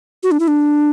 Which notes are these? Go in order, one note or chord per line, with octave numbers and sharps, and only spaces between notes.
F#4
D4
E4
D4